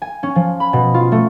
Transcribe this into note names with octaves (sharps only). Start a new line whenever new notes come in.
G#5
C#4
F3
B5
B2
F4
A3